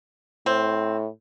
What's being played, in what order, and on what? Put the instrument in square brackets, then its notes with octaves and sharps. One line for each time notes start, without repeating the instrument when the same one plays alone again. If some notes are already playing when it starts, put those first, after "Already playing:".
[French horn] A2 [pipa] C4